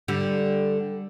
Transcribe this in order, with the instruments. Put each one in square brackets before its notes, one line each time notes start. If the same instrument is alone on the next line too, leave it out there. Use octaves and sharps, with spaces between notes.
[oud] D3 G3